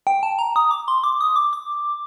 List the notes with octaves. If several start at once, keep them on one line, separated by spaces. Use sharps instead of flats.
G5
A5
A#5
D#6
D6
C6
D6
D#6
D6
D6